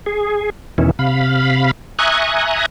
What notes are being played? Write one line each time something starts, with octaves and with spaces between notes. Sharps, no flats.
G#4
E2 B2 D#3 E3 C#4 E4
C3 F5 B5
E5 G#5 A#5 C#6 D#6 F#6